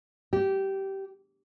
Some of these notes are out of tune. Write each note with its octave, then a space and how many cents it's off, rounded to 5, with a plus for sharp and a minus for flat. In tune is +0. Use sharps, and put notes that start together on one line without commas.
G4 -15